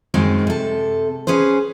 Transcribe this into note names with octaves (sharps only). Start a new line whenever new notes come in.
F#2 D#3 G#3 C4 D#4
C3 A4
C#4 G#4 B4 C5